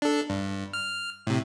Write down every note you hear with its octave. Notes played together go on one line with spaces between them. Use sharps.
D4 A4
G2
F6
A2 C3